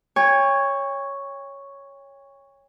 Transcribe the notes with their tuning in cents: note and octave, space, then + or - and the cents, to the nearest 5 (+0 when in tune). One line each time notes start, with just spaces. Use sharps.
C#5 +0 G5 +45